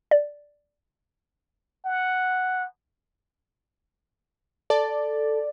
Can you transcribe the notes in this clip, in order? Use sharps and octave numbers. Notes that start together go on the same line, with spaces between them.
D5
F#5
A4 D5